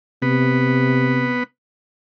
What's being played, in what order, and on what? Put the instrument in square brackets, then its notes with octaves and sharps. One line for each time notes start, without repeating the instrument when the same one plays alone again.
[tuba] C3 [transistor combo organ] B3